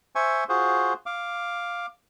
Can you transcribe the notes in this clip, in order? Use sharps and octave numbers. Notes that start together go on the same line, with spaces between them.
C5 E5 G#5 C#6
F4 F#4 G#4 C5
F5 D6